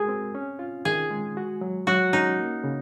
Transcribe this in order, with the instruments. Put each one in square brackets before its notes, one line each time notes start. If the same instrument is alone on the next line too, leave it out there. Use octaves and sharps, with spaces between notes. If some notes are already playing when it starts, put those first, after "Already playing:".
Already playing: [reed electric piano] G#3 F#4 A#4 [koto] G#4
[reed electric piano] C4
C#4
F4
[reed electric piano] D#3 [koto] G#4
[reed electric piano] G#3
F#4
F#3
[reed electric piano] F#3 [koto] F#4
[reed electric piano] C#4 [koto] D#4
[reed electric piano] A#3
C#3